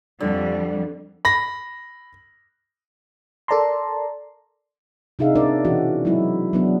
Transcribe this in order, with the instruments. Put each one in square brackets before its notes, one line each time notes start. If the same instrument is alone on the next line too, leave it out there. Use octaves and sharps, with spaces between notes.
[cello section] F2 F3 G3 [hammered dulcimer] D3
[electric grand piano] B5 A#6
[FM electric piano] A4 A#4 D5 A5 A#5 C6
[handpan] C3 D4 D#4 G#4 E5 F5
C#4 D4 A#4 D5
B2 E3 C#4 F#4
F#3 G#3 E4
F#3 B3 D4